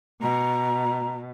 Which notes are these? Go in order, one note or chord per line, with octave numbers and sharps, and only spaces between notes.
B2 A#5